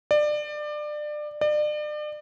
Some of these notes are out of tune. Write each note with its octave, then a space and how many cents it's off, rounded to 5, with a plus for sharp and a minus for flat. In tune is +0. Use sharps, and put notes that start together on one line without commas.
D5 +25
D5 +35